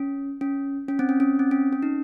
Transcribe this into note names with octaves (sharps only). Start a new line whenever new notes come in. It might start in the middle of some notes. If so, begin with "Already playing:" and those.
Already playing: C#4
C#4
C#4
C4
C#4
C#4
C4
C#4
C#4
D#4